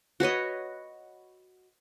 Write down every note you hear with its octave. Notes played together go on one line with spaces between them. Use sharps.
F#4 B4 C#5 D#5